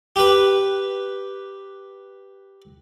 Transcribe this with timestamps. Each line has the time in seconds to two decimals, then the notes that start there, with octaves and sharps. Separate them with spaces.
0.16 G4 B4